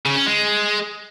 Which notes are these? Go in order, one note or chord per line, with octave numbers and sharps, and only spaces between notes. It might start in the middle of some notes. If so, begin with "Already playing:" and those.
C#3
C#4
G#3